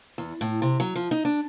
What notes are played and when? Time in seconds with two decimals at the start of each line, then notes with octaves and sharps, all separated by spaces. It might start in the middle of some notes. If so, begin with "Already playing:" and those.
0.18 E2
0.41 A2
0.62 C3
0.80 F#3
0.95 F3
1.11 D#4
1.25 D4